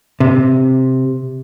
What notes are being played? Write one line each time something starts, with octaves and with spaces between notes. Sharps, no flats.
C3